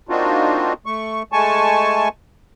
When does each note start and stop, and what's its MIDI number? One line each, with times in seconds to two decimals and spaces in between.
0.09 0.73 58
0.09 0.73 60
0.09 0.73 62
0.09 0.73 63
0.09 0.73 65
0.09 0.73 66
0.86 1.23 57
0.86 1.23 85
1.32 2.08 56
1.32 2.08 57
1.32 2.08 80
1.32 2.08 81
1.32 2.08 85